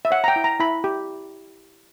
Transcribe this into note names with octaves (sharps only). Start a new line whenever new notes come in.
E5
C#5 F#5
A#5
G5
E4
A#5
E4 B5
G4